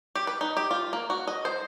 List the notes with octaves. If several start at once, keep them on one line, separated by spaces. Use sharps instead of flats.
G4
B4
D#4
G4
F4
A#3
F#4
D#5
C5